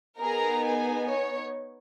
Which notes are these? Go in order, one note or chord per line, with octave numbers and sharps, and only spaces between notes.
B3 D#4 G#4 A#4 A#5
G#4 G#5
C#5